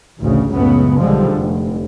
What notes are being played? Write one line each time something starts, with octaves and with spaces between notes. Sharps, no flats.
A1 D2 C#3
C#2 F#2 A2 C#3 B3
B1 D3 F3 G3 G#3
F1